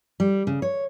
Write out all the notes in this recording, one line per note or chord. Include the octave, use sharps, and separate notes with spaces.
G3
C#3
C#5